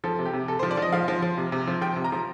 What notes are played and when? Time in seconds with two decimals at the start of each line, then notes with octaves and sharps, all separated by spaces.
0.04 F3 A4
0.19 C3
0.25 G4
0.33 C3
0.48 C3 A4
0.59 F3 C5
0.71 D5
0.77 F3 D#5
0.92 F3 F5
1.08 F3
1.22 F3
1.37 C3
1.52 C3
1.67 F3
1.81 F3 G5
1.96 C3
2.04 A#5
2.12 F3